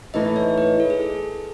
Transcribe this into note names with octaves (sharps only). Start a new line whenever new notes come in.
A2 E3 A3 D#4 D#5
C#5
B4
A4
G#4
A4